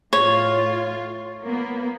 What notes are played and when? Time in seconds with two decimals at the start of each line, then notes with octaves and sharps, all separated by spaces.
0.13 A2 F4 C#5
1.44 A#3 B3